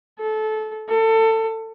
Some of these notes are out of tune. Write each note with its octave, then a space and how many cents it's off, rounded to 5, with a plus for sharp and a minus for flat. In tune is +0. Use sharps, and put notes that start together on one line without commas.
A4 -20
A4 +25